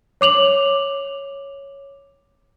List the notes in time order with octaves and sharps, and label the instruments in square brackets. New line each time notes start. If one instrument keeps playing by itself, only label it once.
[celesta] C#5 D6 F7 F#7